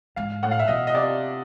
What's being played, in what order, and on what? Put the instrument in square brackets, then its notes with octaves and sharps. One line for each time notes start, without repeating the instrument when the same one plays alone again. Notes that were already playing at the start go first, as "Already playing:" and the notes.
[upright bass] G#2 [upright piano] F5
[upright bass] A2 [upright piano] F#5
[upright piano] F5
E5
[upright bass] B2 [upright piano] D#5
[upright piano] D#5
[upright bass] C3 [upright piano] D5